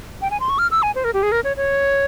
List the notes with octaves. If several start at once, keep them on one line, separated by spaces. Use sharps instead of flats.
G5
G#5
C6
C#6
F6
E6
G#5
C5
A#4
G4
G#4
A#4
C#5
C#5